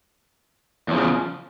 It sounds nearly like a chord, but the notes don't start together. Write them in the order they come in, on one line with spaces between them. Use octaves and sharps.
E2 F3 C#3